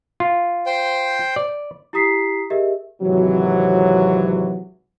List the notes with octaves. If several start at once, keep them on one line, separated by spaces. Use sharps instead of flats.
F4
C5 G5
D5
E4 G4 A#5 D#6 B6 C7
G4 G#4 A#4 D#5 E5
G#1 C3 E3 F#3